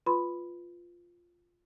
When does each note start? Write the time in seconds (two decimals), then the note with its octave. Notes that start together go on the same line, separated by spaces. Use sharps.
0.06 F4 B4 B5 C6